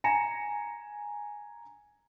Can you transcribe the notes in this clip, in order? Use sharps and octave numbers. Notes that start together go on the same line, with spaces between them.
G#5 A#5 A#6 C#7 E7